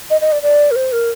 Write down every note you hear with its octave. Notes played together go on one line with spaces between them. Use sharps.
D#5
D#5
D5
D5
A#4
C5
A#4